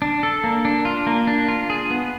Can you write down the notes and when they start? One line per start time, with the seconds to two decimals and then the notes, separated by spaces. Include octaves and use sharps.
0.02 D4
0.23 A4
0.44 A#3
0.65 D4
0.85 F4
1.07 A#3
1.27 D4
1.48 F4
1.70 G#4
1.90 B3